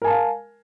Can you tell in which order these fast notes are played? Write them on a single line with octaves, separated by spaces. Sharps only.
A#4 G#5 A5 F5